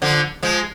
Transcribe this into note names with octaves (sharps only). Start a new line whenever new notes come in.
D3 F3
F3 G#3